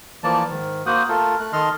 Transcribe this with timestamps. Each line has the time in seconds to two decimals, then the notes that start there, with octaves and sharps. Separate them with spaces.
0.24 E3 F3 A#3 D5 A5
0.50 G#2 D#3
0.86 A#3 F#4 C5 F#5 D#6
1.09 A3 F4 A4 A#4
1.40 A3 F#6
1.53 D#3 A4 D#5 C6 F6